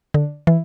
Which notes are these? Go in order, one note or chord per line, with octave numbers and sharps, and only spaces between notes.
D3
E3